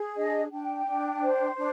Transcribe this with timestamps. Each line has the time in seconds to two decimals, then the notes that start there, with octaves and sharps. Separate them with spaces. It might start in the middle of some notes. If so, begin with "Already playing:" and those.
Already playing: G#4
0.17 D4 D#5
0.51 D4 G5
0.87 D4
1.22 C5
1.57 D4